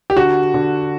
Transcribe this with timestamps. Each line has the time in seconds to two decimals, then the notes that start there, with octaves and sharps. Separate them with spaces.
0.10 G4
0.17 D3 F#4
0.54 D3